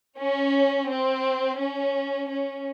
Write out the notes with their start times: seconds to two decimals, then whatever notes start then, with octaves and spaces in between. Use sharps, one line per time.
0.19 C#4
0.89 C4
1.60 C#4
2.29 C#4